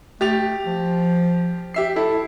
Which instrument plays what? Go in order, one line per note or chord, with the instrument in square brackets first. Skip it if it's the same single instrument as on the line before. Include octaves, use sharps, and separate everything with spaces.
[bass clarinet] A3 [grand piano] G4 A6 F7
[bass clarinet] F3
[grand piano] G4 E5 C7
[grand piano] E4 [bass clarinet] A4